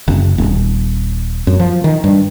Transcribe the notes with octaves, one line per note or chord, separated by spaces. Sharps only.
F#1
D#1
F#2
F3
D#3
G2